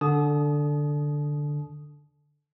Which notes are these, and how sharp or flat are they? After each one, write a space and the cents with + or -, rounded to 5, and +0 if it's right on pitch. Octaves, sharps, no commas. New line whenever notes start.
D3 +0 A5 -40 D#6 +0